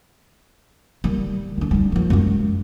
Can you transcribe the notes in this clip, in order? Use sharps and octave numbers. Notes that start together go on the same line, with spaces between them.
D#3 G3
D3 D4
G3 D#4
D#3 F3
F#2 G#3